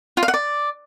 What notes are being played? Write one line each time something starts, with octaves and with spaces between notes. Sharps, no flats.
F4
F5
F#5
D5